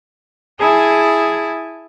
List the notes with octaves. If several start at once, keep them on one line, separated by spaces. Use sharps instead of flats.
E4 G#4 G#5 A5